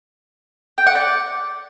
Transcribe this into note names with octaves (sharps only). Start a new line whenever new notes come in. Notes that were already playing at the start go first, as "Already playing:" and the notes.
G5
F#5
D5